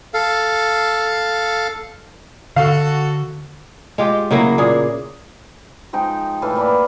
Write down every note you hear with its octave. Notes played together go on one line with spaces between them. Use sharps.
A4 F5
D3 F#4 A4 F5
G#3 F4 G4
C#3 F#3 A#3 E4
A#2 G#4
F3 G#3 D#4 G5
A2 E3 F5
A#3 D5 F5 B5